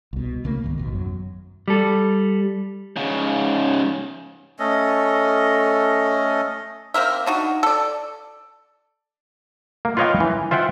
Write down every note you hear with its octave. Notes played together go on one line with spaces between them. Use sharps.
C2 B2
C2 C#3 A3 A#3
C#2 G#2 D#3 B3
A1 D#2 B2
F#2 F#3
G3 A4
G#2 C#3
A3 C#4 A4 D#5
A#3 C4 A#4 E5
D4 D#4 F#4
A4 D5
A#3
F4 B4 C#5 D#5 F5 G5
E3
F4 C5 E5 F#5 G5